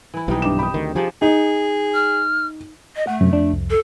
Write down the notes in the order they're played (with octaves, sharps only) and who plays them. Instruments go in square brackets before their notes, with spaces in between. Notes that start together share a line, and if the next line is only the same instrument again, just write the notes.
[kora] E3 E4
[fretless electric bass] B1 E3 [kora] C3 G3 D#4
[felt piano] G2 D6 E7
[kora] G4 [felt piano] B5 D#6
[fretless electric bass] D2 D#3
[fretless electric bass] F3 [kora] D4 D#4 G#4 [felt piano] G4
[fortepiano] D#4 [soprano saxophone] G#4
[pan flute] F6
D#5
[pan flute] A3 [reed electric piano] F#5
[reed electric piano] F#2 [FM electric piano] C3 F#3
[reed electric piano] F2 [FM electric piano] D4
[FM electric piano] C2
[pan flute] A4